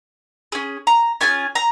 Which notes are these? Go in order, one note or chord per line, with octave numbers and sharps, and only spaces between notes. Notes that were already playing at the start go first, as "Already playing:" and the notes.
C#4 G#4
A#5
C#4 F4 G#4 G#5
A#5